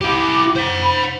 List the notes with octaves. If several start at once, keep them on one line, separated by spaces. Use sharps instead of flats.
E4 G4 D6
C5 F#5
B5